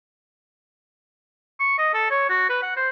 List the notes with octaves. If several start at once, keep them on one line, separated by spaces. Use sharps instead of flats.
C#6
D#5
A4
C#5
F#4
B4
F#5
C5